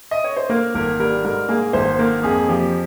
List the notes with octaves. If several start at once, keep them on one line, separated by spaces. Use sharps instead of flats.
D#5
C#5
C5
A#3 A#4
G#1 A#4
G3 A#4
G#2 A#4
A#3 G#4
G#1 C5
A#3 A#4
F2 G#4
F3 G4